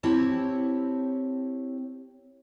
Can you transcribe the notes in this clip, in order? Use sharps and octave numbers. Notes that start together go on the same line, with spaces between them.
C4 E4 G4 C#5 A5